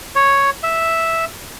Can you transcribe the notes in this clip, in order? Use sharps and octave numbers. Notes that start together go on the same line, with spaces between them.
C#5
E5